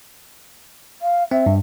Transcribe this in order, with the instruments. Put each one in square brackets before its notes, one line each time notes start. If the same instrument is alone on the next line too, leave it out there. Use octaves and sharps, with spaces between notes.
[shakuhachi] F5
[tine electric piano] C4 [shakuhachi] E5
[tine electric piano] G2